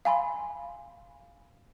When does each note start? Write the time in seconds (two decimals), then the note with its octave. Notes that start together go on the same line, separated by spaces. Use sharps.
0.05 F5 G#5 B5 C6